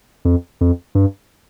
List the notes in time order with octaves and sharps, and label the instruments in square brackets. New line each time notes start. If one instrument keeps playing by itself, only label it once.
[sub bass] F2
F2
G2